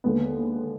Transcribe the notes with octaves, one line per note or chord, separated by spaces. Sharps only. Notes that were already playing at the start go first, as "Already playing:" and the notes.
D#2 D3 G#3 B3